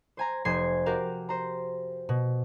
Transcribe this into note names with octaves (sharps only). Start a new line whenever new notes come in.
C5 G#5 A#5
F1 C5 G#5 G#6 C7
F#4 G4 A#4 F5
C5 A#5
B2